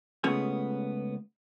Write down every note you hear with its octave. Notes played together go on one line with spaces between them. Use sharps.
C#2 A3 B3 C#4 G#4 G#5